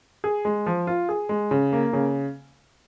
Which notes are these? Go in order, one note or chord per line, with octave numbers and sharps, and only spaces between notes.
G#4
G#3
F3
F4
G#4
G#3
C#3
A#3
C#3